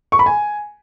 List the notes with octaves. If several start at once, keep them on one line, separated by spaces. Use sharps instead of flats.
C#6
B5
G#5